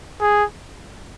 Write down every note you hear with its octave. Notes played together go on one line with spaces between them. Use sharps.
G#4